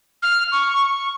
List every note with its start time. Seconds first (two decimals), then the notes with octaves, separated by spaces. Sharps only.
0.22 F6
0.52 C#6